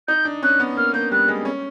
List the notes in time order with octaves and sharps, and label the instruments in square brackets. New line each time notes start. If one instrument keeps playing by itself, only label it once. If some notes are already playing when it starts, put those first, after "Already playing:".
[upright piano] D#4 [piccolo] G6
[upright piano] D4
[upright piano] C#4 [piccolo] F#6
[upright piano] B3
[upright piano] A#3 [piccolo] F6
[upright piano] A#3 [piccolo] G6
[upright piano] G3 [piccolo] F#6
[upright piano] G#3
C#4